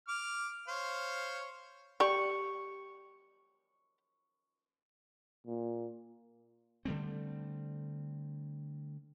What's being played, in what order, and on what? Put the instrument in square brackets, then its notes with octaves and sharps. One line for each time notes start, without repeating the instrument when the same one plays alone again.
[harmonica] D6 F6
C5 C#5 F5
[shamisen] G4 D5 [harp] C#6
[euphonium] A#2
[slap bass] D3 G3 A3 C4